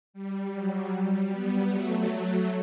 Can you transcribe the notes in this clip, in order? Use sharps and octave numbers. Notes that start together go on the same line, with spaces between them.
G3
F#3
G3
G3 B3
F#3 A3
F#3 A3